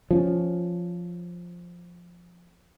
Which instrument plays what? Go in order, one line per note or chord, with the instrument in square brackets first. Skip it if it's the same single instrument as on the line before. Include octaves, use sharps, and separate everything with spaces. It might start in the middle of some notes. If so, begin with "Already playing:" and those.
[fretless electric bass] F3 C4 C#4